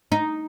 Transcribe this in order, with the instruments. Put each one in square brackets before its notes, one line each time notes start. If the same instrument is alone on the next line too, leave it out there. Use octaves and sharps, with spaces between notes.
[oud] D#4